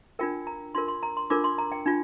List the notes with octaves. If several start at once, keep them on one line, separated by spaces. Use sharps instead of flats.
D4 F4 A#4 G5
A#5
D4 F4 A#4 C6
C6
A#5
C6
D4 F4 A#4 D6
C6
A#5
G5
D4 F4